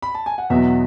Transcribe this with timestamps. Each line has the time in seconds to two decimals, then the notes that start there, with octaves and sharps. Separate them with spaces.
0.02 B5
0.15 A5
0.26 G#5
0.38 F#5
0.50 E2 B2 F#3 E5